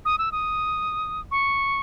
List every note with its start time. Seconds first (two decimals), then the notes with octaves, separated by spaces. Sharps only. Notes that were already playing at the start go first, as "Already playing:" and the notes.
0.05 D#6
0.19 E6
0.32 D#6
1.31 C#6